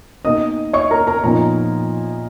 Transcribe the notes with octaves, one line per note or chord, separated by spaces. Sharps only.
B2 A#3 D#4 D#5 D#6
C#5 C#6
A#4 A#5
A#4 A#5
A#2 F3 B3 D#4 A#4 A#5